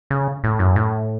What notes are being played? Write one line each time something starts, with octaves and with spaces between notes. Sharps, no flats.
C#3
A2
F#2
A2